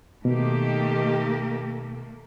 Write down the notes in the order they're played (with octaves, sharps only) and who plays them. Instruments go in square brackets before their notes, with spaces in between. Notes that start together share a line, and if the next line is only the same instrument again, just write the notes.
[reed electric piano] B2 [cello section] D#3 G4 [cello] A3 A#3